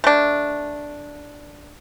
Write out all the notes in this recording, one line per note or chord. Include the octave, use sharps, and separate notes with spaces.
A3 D4